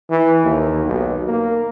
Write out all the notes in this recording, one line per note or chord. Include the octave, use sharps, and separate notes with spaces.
E3
D#2
B1
A#3